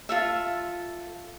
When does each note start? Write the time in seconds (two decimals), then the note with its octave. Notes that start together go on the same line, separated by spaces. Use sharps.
0.09 F4 A4 E5